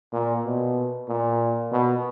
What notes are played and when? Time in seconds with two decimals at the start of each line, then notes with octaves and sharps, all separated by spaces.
0.13 A#2
0.45 B2
1.09 A#2
1.72 B2